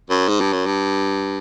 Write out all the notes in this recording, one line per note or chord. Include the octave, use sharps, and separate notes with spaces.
F#2
G#2
G2
F#2
G2